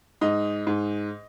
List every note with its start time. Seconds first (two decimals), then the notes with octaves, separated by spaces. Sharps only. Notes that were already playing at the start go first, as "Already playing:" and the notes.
0.21 G#2 D#5
0.67 G#2